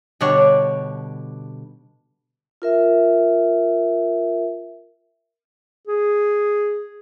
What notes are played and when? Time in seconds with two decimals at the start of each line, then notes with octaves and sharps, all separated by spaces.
0.21 B2 D3 G3 D4 C#5
2.62 F4 A#4 E5
5.87 G#4